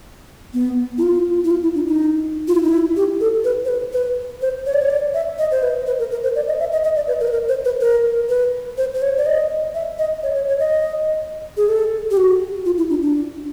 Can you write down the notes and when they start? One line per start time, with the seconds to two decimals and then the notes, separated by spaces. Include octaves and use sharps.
0.54 B3
0.98 E4
1.02 F4
1.44 E4
1.51 F4
1.63 E4
1.75 D4
1.87 D#4
2.48 F4
2.55 E4
2.62 D#4
2.69 E4
2.96 G4
3.20 A4
3.44 B4
3.65 C5
3.68 B4
3.93 B4
4.42 C5
4.66 C#5
4.74 D5
4.82 C#5
4.90 D5
5.14 E5
5.39 D#5
5.51 C5
5.63 B4
5.87 B4
5.99 A#4
6.11 A#4
6.23 C5
6.36 D5
6.48 D#5
6.60 E5
6.72 D#5
6.84 D#5
6.96 D5
7.08 B4
7.20 A#4
7.28 B4
7.32 A#4
7.49 C5
7.65 B4
7.81 A#4
8.29 B4
8.78 C5
8.95 C5
9.02 C#5
9.17 D5
9.26 D#5
9.75 E5
9.99 D#5
10.23 C#5
10.35 C#5
10.48 C#5
10.59 D#5
11.57 G#4
11.69 A4
12.11 G4
12.17 F#4
12.65 F4
12.77 E4
12.90 D4
13.02 D4